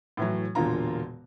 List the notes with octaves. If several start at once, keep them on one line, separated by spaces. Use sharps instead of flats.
A2 E3 F#3
E1 A#2 D3 F4 A#5